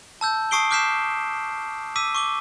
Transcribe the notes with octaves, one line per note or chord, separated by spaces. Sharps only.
A5 E6 G6
A5 C#6 D#6 C7 D7 G7
D6 F6 G6 B6 C7 E7
D6 E6 B6 D#7
C#6 D6 G7